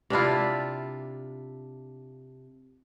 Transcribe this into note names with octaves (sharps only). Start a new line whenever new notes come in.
C3 D4 E4 F4